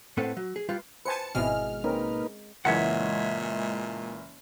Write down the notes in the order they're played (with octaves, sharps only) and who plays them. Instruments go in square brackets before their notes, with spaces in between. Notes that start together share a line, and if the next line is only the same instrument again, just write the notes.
[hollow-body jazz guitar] A2 C4 A4 B4 F#5
F#3
G#4
G3 F4 B4
[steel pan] B4 C5 G#5 [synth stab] A5 C#7
[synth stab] G#1 B2 F6 [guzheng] G#3 [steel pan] C4 E4
[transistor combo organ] A#3 D#4 B4 [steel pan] C4 C#4 A#4
[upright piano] F#1 E3 [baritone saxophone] A#2 [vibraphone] G#3 D#5 [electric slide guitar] C#5 E5 F#5